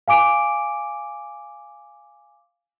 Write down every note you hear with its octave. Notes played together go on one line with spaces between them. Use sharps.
F5 G#5 D6 D7